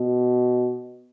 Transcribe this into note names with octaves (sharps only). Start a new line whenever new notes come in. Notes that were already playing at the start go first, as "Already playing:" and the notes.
Already playing: B2